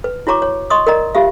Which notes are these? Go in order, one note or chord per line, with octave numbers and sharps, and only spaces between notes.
B4
E4 F#4 C#5 A#5 C#6 D6
C#5
D#5 C6 C#6 D#6
A#4 D5 D#5 A#5
F4 G4 E5 F5